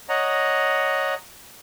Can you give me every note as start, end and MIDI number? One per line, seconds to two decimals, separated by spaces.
0.09 1.14 73
0.09 1.14 75
0.09 1.14 78
0.09 1.14 82